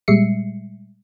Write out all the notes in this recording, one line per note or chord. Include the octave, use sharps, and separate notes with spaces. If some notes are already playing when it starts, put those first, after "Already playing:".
A#2 G3 G#3 E5 C7 C#7